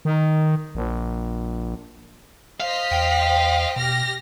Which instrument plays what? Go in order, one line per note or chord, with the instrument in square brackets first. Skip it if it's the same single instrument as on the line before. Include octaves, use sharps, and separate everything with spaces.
[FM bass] D#3
A#1
[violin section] C5 D#5 B6 [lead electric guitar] F5
[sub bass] E2 [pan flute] G5
[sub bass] B2 [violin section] G4 F6 A#6